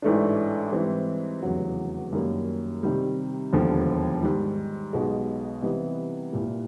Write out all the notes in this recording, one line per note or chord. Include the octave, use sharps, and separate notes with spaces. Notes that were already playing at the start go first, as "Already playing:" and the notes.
A1 G#2 E3 A3 D4
G#2 E3 G3 C4
F1 E2 C#3 F#3
F#2 D#3 G3 A#3
C3 D#3 G3
E1 D#2 D3 F3
G#2 D#3 G3
B1 B2 G#3
C3 E3 G3 B3 D#4
C2 A#2 G3